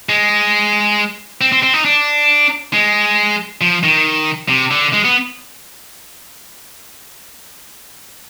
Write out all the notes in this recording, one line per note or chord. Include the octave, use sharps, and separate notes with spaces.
G#3
C4
C4
C4
D#4
D4
G#3
F3
D#3
C3
D3
G#3
B3